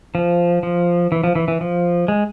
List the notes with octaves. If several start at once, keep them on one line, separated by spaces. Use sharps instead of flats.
F3
F3
E3
F3
E3
E3
F3
G#3